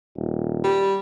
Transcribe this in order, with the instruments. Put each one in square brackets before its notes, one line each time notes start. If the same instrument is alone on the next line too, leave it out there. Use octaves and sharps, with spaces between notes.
[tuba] D#1
[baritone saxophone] G3